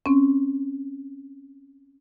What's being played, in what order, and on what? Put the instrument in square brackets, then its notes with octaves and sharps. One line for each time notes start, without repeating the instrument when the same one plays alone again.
[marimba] C4 C#4